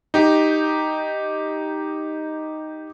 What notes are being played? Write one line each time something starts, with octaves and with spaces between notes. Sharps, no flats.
D#4 G4